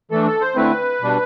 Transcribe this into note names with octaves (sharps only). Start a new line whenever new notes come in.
E3 A3 D4 A4
A4
C5
D3 A3 C4 E4 B4
B2 G3 D4